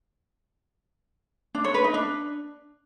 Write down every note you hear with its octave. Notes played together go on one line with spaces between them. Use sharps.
D4
C#5
B4
D#4
D4